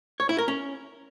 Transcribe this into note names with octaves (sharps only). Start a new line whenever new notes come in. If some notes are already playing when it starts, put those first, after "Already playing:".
C#5
E4
A#4
C#4